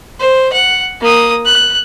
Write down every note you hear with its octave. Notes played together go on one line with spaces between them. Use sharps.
C5
F#5
A#3 D#6
F#6